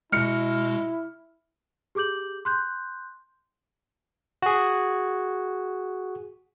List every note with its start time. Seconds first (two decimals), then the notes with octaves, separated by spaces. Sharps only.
0.12 B2 G#3 E4 F6 C#7
1.95 G4 G#4 D6 G6 F#7
2.45 C6 F#6 G6
4.42 F#4 G#4